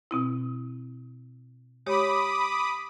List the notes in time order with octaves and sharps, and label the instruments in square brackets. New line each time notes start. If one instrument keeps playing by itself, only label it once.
[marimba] B2 C4 E4
[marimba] G#3 G4 C#5 [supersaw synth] B5 D6 D#6